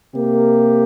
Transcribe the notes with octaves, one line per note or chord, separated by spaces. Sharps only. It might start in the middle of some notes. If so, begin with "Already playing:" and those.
C3 A#3 G4 A#4